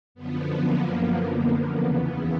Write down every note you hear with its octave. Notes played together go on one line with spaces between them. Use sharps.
F#2 D3 F3 B3
A#3
A#3
E2 C#3 E3 B3